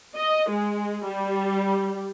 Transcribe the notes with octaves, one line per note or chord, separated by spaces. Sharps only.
D#5
G#3
G3